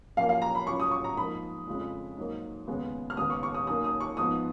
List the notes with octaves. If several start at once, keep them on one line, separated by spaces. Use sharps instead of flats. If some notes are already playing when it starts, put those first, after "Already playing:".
F#2 F3 A#3 F5
F5
A#5
B5
C#2 C#3 F#3 C#6
D#6
C#6
A#5
G#2 F3 A#3 B5
F2 C#3 G#3
G#2 F#3 A#3
D#2 C#3 G#3 B3
F6
D#2 C#3 G#3 B3 D#6
C#6
C#6
D#6
F#2 D#3 A#3 D#6
D#6
C#6
G#2 F3 B3 D#6